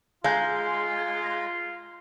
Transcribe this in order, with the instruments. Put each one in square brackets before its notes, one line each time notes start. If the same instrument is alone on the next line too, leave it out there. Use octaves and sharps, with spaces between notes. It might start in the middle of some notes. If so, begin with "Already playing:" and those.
[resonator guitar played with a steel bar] G#3 [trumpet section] F4 [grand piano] F5 A#5 G6